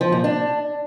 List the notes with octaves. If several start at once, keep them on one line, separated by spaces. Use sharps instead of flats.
F3
A#2
D4